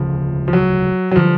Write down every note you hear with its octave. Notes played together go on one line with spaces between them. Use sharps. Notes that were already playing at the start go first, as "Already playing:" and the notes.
Already playing: E1 D2 C#3 F3
F3
F#3
F#3
D3 F3 G3